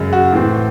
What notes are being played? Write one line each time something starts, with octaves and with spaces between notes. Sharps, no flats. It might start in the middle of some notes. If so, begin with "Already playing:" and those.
Already playing: F#2 C#3 G#3
F#4
A2 E3 C4